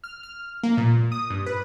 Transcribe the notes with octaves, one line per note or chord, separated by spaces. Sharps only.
F6
F6
A#3
A#2
D#6
G2
B4